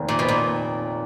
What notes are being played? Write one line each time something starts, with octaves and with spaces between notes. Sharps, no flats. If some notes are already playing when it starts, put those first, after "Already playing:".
Already playing: F1 D#2 D#3
A#2
B2
A#2